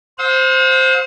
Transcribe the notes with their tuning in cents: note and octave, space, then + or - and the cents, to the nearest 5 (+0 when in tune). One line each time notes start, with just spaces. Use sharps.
C5 +0 F5 +45 E6 -40